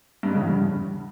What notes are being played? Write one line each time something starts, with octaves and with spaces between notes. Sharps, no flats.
G2
G#2
C#3
E2
G2